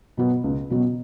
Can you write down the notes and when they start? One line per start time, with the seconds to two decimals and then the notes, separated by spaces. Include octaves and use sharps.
0.17 B2 F#3 B3
0.44 C#2
0.70 B2 F#3 B3